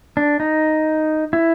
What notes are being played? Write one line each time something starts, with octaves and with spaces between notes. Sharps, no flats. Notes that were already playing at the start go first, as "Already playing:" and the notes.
D4
D#4
E4